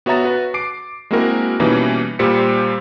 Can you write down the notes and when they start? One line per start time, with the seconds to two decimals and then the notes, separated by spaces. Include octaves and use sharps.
0.06 B3 F#4 C#5 E5 A#5 A6
0.24 F#4 B4
0.54 D6 C7 D7
1.11 G#3 A#3 C4 E4 F#4 A#4
1.60 B2 E3 G3 A#3 C#4 D#4
2.19 A#2 G3 G4 C5 B6 C#7